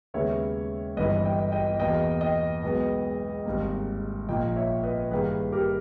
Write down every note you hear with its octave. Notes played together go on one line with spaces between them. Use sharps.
D#2 C#3 G#3 B3 C#5 E5
G1 G2 E3 B4 D#5
D#5 G5
D#5 G5
E2 B2 A#3 D#5 G5
D#5 G5
B1 B2 G#3 B3
G#1 G#2 G3 A#3
A#1 A#2 A#3 D#5 G5
C#5 E5
B4 D#5
G2 D#3 A#3 G#4 B4
G4 A#4